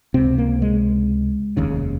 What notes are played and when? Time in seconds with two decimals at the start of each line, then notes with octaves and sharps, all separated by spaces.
0.14 C#2 C3 C4
0.38 A#3
0.62 G#3
1.57 F1 D#2 C#3